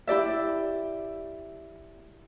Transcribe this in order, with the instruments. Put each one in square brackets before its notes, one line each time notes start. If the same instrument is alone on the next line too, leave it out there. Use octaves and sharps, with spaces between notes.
[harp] E4 G4 D5 E5